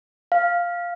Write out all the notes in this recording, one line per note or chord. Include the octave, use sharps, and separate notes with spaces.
F5